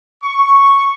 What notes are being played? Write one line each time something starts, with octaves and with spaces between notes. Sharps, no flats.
C#6